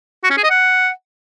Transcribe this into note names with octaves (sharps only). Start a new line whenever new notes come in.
F#4
C#4
G#4
D#5
F#5